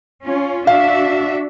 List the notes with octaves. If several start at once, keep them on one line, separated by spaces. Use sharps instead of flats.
C#4 F4
D4 F#4 E5 F5